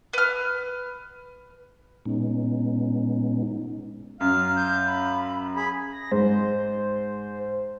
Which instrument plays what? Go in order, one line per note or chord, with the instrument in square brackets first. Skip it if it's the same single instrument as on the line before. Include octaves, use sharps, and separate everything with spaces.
[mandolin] B4 F6
[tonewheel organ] A#2 G#3 B3 C#4 D#4
[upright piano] F#2 [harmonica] F5 [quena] F6
[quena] G6
B5
[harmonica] G#4 B5
[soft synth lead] A#6
[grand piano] G#2 [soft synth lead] C5